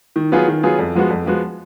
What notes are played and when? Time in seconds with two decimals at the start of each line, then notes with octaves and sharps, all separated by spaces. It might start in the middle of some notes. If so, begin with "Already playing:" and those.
0.16 D#3
0.32 F#3 B3 F4 G#4
0.48 D#3
0.63 F#3 B3 F4 G#4
0.79 F2
0.95 F3 G#3 B3 F#4
1.10 F2
1.26 F3 G#3 B3 F#4